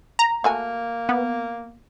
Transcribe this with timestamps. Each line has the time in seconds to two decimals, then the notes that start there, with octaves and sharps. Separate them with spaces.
0.19 A#5
0.44 A3 A#3 F#4 G#5
1.09 B3